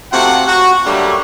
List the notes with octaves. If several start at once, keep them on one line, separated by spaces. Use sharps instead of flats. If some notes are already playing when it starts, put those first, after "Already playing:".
C3 A3 F4 F#4 F#5
F#4
D3 F#3 G3 A3 A#3